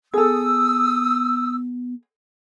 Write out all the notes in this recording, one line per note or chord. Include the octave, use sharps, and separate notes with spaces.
B3 G#4 A4 D#6 E6